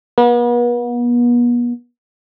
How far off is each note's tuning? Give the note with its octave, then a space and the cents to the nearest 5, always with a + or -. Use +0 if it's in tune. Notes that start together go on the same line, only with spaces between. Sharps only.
B3 -40